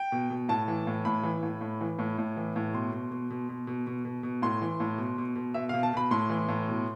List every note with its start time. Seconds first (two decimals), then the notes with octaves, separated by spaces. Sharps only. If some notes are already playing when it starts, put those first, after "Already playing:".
Already playing: G5
0.12 B2
0.30 B2
0.49 A2 A5
0.68 E3
0.87 A2
1.05 A2 B5
1.23 E3
1.43 A2
1.61 A2
1.81 E3
1.99 A2
2.18 A2
2.36 E3
2.56 A2
2.73 B2 C6
2.92 B2
3.11 B2
3.31 B2
3.49 B2
3.67 B2
3.87 B2
4.05 B2
4.23 B2
4.42 A2 C6
4.62 E3
4.80 A2
4.98 B2
5.18 B2
5.36 B2
5.54 B2 E5
5.69 B2 F5
5.83 A5
5.93 B2 B5
6.11 A2 C6
6.30 E3
6.49 A2
6.67 B2